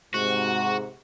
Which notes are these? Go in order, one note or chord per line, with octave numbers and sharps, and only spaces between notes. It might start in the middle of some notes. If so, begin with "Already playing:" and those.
G#2 C3 F#4